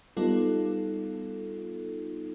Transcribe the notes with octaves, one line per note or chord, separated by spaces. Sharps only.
G3 B3 D#4 F4 A4